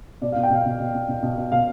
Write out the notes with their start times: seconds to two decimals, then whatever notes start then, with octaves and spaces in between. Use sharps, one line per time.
0.21 B2 D5
0.32 B2 F5
0.43 G5
0.50 B2 F5
0.65 B2
0.80 B2
0.94 B2
1.08 B2
1.22 B2
1.37 B2
1.52 B2 F5